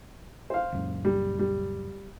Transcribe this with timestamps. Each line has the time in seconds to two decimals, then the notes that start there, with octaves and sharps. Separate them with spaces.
0.50 C5 F5
0.73 C#2 F#2 A#2
1.05 G3
1.39 G3